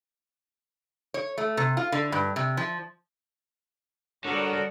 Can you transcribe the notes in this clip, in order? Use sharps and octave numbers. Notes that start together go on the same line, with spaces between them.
C#5
A3
C3
F4
D3
G2
C3
F3
D3 G3 B3 F#4 A4 A#4 C#5 D5